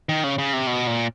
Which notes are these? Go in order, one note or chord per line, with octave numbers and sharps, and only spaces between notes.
D#3
C#3
C#3
C3
B2
A#2